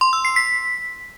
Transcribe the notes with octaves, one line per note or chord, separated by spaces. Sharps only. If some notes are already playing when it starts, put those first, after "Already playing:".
C6
E6
C7
B6